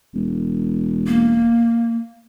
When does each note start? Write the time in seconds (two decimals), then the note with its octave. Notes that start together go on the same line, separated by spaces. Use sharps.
0.14 E1
1.07 A#3